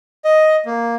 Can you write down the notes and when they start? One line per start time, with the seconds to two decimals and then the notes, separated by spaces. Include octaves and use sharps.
0.25 D#5
0.66 A#3